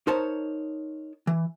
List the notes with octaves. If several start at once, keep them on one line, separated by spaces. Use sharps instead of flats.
D#4 A#4 C5 C#5 A5
E3